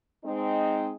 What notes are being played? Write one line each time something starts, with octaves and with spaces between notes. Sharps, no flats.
G#3 C4 D#4